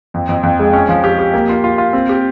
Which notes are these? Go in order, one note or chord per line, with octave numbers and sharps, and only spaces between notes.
F2
F2
F2
G#3
C#4
F3
G4
G4
A#3
F4
F4
F4
C4
G4